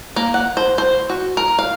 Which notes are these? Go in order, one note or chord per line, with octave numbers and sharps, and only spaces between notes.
A#3
F#5
C5
C5
F#4
A#4
F5